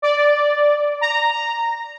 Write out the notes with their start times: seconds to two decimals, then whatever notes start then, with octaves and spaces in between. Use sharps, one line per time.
0.02 D5
1.01 A#5